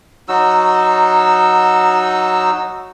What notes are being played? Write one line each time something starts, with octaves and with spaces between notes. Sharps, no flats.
F#3 D#4 F#4 E6